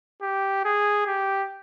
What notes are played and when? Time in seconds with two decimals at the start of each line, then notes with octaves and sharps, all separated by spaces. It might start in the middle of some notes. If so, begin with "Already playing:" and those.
0.22 G4
0.65 G#4
1.07 G4